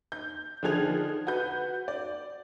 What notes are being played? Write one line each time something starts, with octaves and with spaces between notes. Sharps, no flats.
G6
D3 D#3 F3 G#4 G#6 F7
F#4 B4 G6
D5